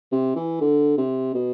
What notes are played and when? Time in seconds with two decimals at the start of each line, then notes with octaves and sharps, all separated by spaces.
0.12 C3
0.36 E3
0.61 D3
0.97 C3
1.34 B2